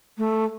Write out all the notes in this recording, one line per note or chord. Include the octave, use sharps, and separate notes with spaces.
A3